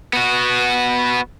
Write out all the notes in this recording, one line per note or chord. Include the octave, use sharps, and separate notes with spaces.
B3 F#4